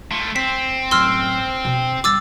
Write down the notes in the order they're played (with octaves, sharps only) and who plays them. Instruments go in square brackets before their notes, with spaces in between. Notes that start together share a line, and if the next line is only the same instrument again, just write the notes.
[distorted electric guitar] A3 F4
[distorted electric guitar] C4 [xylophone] B6
[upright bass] F#2 A2 [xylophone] C6 E6 F6
[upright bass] B2 D4
[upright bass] G2 [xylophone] D6 E6 A6